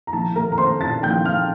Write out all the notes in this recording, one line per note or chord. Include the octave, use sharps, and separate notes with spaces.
A#5
A#1 A5
A3 A#4 A#5
A#5
A3 C5 C6
A#2 A5 A6
A#1 G5 G6
A3 F5 F6